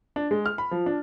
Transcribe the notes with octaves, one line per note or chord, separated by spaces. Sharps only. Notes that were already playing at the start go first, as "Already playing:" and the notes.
D4
G#3
F6
B5
F3
D4